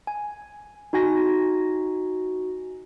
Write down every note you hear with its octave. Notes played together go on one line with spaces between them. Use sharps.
G#5
D#4 F#4 G#5 A#6